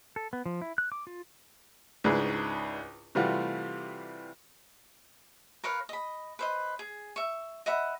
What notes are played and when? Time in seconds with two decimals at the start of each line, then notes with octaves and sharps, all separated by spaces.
0.16 A4
0.33 B3
0.46 F3
0.62 E4
0.78 F#6
0.92 D6
1.07 F4
2.04 C#2 G#2 D4 E4 G#4 B4
3.15 C3 E3 G3 A3 F4 F#4
5.64 A#4 B4 C#5 F5
5.89 D#5 B5
6.39 B4 C5 D#5
6.79 G#4
7.16 E5 C#6
7.66 D#5 E5 F#5 B5